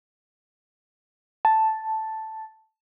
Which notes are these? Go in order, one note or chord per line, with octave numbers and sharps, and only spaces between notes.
A5